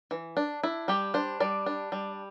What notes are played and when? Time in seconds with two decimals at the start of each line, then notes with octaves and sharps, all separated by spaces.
0.11 E3
0.37 D4
0.63 D4 E4
0.88 G3 G4
1.14 D4 C5
1.40 G3 D5
1.66 D4
1.92 G3